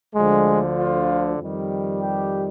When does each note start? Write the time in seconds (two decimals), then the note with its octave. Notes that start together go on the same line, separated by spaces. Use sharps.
0.15 D2 D3 F3 G#3
0.78 F4
1.39 F2 D#3 G3
2.01 G4